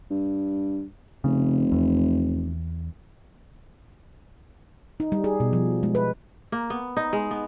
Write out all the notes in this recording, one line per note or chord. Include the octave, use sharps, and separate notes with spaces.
G2
F1 C#3
E2
D#4
G3
G#4
B2
F3
G#3
B4
A#3
B3
D#4
G#3
B3